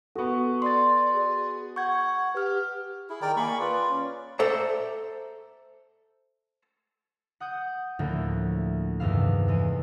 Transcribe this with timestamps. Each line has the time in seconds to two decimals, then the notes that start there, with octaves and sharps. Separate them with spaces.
0.15 B3 F#4 A4 C#6
0.62 D5 C6 A6
1.14 G#4
1.76 F#5 C#6 G6 G#6
2.35 G4 B4 F6
3.10 E4 G#4
3.22 D#3 A#4 D5 G5
3.37 A#3 G#4 B5 C#6
3.60 F4 B4 D5
3.90 C#4
4.39 A4 C5 D5 E5 A#5
7.40 F#5 D#6 G6
7.99 D2 A2 D3 F3 A3 A#3
9.00 E2 G2 C3 D#3 E4 F5
9.48 E2 E3 G#3 D#7